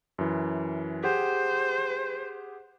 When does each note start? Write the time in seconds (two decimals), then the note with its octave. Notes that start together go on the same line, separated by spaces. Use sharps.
0.18 F#2 E3
1.03 G4 G#4 C5 F#5